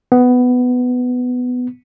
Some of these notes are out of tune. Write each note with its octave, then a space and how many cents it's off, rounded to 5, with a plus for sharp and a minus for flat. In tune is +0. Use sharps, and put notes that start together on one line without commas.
B3 +10